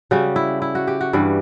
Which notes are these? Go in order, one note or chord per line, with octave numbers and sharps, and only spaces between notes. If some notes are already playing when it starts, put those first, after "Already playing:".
C#3 G3 C#4 F#4
E4
E4
F#4
G4
F#4
G2 E3 G3